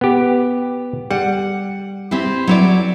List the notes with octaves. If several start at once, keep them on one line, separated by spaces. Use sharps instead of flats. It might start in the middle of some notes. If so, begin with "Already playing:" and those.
B3 G4
G3 F#5
C4 E4 G4
F#3 E4 D5